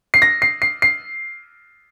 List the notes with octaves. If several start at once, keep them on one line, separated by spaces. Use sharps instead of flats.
C7
A#6
C7
C7
C7